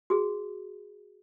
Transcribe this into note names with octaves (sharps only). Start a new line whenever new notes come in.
F#4 G#4